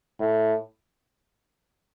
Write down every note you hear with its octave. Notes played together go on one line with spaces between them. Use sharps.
A2